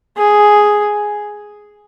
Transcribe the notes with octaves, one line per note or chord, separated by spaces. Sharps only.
G#4